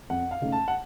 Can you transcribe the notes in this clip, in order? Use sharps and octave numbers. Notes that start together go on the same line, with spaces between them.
F2 F#5
F5
C#3 A3 D#4
A5
F#5